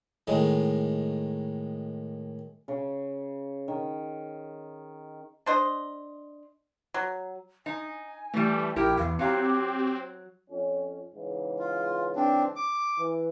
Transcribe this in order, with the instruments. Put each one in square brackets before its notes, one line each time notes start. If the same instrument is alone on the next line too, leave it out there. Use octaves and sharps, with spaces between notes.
[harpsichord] A2 D#3 G#3
[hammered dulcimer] C#3
D#3
[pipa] D4 C5 D#5
F#3
[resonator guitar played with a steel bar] D#4 [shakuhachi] G#5
[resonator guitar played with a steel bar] E3 G3 [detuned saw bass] A3
[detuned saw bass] A#1 [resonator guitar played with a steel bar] E4 G4 A#4 [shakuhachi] G5
[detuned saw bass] E2 [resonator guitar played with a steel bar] E3 [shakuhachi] F5
[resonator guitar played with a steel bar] F#3 F5 A#5 [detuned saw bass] C4 [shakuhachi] G4
[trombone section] F2 C#4
G#2 C#3 E3
[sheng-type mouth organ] F4
C4 D4
D6
[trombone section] E3